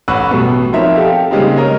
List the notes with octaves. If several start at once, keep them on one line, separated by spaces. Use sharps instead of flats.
A1 F#5 B5 C#6 E6 F#6
B2 G3 A3 B3
F3 C4 D#4 A#4 C#5 E5
G4 A4 F5
C#3 G3 G#3 A#3 C4 D#4
A#4 C#5 D#5